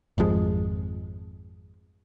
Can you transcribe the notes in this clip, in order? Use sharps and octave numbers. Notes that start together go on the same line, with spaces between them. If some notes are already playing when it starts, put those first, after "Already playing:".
G#1 F2 F3 G#3